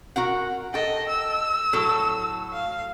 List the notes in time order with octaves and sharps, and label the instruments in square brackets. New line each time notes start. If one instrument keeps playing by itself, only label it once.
[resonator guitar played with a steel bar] F#4 A#4 F#5
[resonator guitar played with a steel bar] A4 G5 [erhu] D#5
[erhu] E6
[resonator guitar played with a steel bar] A2 F#3 A4
[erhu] F5